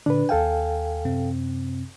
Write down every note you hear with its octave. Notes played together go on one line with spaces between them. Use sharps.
A#2 D3 D4 B4
D#2 A4 F5 G5 G#5
F#2 C3 C4